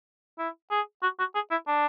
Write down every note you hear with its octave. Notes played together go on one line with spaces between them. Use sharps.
E4
G#4
F#4
F#4
G#4
E4
D4